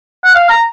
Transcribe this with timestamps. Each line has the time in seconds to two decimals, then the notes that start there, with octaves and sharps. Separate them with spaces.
0.24 F#5
0.35 F5
0.50 A#5